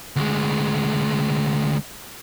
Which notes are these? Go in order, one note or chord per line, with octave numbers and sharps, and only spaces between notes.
D2 G#3